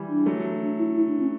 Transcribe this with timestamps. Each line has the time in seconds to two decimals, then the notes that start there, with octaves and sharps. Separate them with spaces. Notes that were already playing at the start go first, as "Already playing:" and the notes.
Already playing: E3 G3
0.09 D4
0.26 F#3 A3
0.61 D4
0.79 E4
0.97 E4
1.09 D4
1.20 C#4